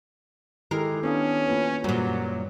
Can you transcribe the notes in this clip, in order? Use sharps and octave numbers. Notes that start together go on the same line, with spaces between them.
D#3 G#3 E4 G4 A4 A#4 C7
B3 C#4 D4 B4 C#5 F5 D#6
A#3 F4 B4
F#2 A#2 F#3 G3 C5